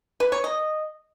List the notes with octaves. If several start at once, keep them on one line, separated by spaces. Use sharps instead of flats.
B4
C#5
D#5